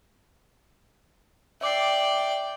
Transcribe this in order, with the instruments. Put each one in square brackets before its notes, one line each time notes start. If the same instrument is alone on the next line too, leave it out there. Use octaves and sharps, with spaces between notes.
[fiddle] D5 G5 [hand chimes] E5 D6 C7